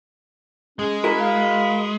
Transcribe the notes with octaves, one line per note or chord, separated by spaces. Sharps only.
G#3 C#4 G#4
E4 F#4 A#4 B5
F5